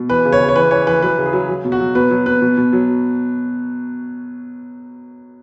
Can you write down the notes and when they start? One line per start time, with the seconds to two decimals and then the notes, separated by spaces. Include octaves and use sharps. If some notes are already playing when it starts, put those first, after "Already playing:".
Already playing: B2
0.09 E3 B4
0.25 C#3
0.33 C#5
0.40 C#3
0.49 C#5
0.56 E3 B4
0.71 E3 C#5
0.87 E3 B4
1.02 F#3 B4
1.18 C#3
1.26 G#4
1.33 F#3
1.49 F#3
1.65 B2
1.72 F#4
1.80 F#3
1.95 B2 B4
2.11 F#3
2.26 B2 B4
2.42 B2
2.57 B2
2.73 F#3